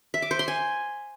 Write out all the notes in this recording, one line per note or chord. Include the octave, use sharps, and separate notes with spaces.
E5
D6
C5
C6
G#5